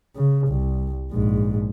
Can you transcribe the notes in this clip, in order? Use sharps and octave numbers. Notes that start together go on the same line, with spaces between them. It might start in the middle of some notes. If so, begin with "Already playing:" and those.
C#3
C2
A#1 G#2